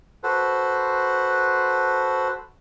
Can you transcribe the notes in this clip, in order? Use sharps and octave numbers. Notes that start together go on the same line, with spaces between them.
F#4 A4 B4 C5